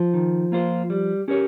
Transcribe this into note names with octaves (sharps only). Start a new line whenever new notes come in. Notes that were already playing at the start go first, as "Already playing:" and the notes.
Already playing: F3
D#3
A#3 F4 C5
G3
C#4 G4 A#4 C#5